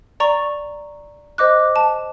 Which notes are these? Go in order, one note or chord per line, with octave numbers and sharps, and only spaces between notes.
D5 A#5 C#6
C5 D#5 D6 F#6
A5